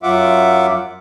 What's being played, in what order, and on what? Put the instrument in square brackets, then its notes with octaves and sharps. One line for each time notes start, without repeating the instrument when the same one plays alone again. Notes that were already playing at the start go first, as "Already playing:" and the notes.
[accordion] F#2 F#3 F4 E5 F#5 D6